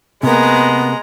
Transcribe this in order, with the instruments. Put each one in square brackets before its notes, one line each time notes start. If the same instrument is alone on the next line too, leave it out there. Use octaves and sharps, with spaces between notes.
[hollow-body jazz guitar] C3 A#3 [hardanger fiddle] G#3 A#5 [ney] B3